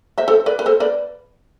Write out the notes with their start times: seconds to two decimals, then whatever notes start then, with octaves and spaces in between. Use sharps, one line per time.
0.18 C5 E5
0.28 A4 C5
0.46 B4 D5
0.59 B4
0.66 A4 C5
0.80 B4 D5